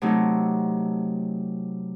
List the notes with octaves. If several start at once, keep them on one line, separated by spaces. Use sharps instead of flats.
C3 F#3 A3 D#4